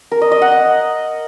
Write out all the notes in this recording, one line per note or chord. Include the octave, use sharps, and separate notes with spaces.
A#4
D#5
D#5
F#5
D#5